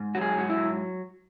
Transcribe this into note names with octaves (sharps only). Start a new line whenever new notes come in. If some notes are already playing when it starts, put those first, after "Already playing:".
Already playing: G#2
F#3 F#4
G#4
G#2 F#4
E4
F#3